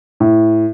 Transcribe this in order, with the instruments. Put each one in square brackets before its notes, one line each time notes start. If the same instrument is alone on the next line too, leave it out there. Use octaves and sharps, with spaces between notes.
[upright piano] A2